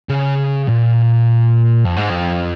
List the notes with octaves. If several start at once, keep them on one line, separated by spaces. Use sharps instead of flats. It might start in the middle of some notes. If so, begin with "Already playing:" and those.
C#3
A#2
F2
G#2
F2